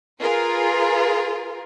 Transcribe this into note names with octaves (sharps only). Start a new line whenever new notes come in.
F4 G#4 A#4 B4